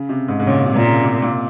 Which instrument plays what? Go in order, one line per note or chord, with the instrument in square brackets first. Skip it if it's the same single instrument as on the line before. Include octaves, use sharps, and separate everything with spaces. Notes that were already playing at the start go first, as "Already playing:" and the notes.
Already playing: [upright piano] C#3
C3
G#2
G#2
[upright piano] A#2 [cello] C#3
[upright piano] C3
[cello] A#2
[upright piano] C#3
C3
A#2